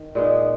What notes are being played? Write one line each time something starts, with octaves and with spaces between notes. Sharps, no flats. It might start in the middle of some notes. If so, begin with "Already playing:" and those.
Already playing: D#3
A#2 G#3 B3 D#4